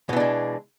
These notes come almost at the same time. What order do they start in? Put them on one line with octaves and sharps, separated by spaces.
B2 E3 D4 G#3